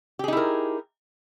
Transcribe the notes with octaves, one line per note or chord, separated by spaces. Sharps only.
D#4 E4 G4 G#4 A#4